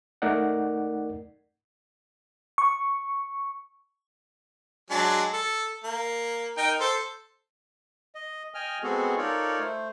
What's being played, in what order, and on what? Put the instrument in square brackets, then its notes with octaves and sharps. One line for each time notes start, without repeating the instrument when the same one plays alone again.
[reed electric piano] A3 D#4 A#4 D5 F#5
[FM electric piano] C#6
[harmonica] F#3 G#3 D4
A4
A#3
D#4 A#4 G5
A4 C5
[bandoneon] D#5
D#5 G5 G#5 F6
G#3 B3 C4 F#4 G#4 A4
D#4 F4 A4 A#4 C#5 D5
A3 C5